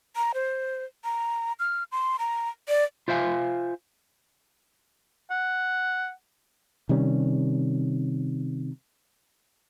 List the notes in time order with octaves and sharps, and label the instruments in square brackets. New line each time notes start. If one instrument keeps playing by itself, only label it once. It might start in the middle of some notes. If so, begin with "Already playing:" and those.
[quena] A#5
C5
A#5
F6
C6
A#5
D5
[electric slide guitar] F4 C5 E5 F5 G#5
[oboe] F#5
[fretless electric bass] C3 D#3 G3 C#4